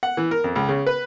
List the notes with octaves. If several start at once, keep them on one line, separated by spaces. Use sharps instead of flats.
F#5
E3
A#4
F2
C#2
C#3
B4